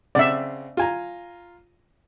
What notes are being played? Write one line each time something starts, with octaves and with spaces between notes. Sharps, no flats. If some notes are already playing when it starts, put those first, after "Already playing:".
C#3 C4 D5 E5 F#5
F4 G#5 A#5